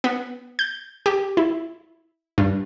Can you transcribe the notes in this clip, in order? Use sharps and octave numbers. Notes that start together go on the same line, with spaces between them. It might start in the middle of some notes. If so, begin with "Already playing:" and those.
B3
G6
G4
E4
G2